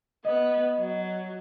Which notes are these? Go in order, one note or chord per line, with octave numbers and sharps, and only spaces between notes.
B3 D#5
F#3